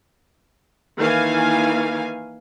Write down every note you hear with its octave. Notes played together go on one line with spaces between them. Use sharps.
D#3 E3 A#3 F5 G#5